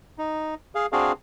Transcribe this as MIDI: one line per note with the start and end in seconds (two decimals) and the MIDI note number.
0.18 0.55 63
0.75 0.86 68
0.75 0.86 77
0.92 1.12 60
0.92 1.12 62
0.92 1.12 66
0.92 1.12 68
0.92 1.12 77